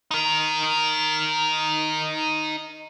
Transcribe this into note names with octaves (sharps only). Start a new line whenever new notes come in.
D#4 A#4